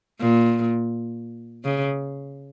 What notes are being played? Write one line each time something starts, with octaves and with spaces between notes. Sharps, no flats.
A#2
C#3